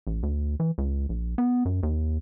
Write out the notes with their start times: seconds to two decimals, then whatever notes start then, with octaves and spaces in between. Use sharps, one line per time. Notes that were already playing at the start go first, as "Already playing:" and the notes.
0.07 A1
0.23 D2
0.60 E3
0.78 C#2
1.09 A#1
1.38 B3
1.65 F#2
1.83 D#2